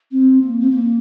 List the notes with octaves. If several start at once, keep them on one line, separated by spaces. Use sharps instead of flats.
C4
A#3
C4
A#3